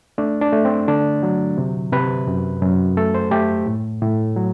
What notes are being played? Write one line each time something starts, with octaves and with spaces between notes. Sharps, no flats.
A3 D4
D4
A3
C4
D3 D4
F#3
C3
C3 B4
F#2
F#2
A3 A4
C5
A3 G4
A2
A2
F#3